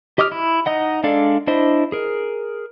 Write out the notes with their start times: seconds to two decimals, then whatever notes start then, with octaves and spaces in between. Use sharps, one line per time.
0.18 G4 D#5 D6 D#6 F6
0.32 E4
0.66 D#4 D#5 F#5
1.03 G#3 D4 A4 D5 F5
1.47 D4 E4 C5 D#5
1.92 G#4 A#4